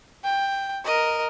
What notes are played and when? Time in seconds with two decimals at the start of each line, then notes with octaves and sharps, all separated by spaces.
0.24 G5
0.85 A#4 D#5